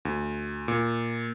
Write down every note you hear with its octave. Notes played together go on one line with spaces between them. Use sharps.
D2
A#2